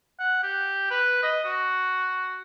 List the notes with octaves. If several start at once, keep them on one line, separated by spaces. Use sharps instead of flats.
F#5
G4
B4
D#5
F#4